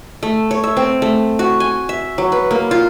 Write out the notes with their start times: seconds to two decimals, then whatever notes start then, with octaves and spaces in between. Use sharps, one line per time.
0.23 A3
0.51 C#5
0.64 E5
0.77 C4
1.02 A3
1.39 F#4
1.60 G#5
1.89 E5
2.18 F#3
2.32 B4
2.51 A#3
2.71 F4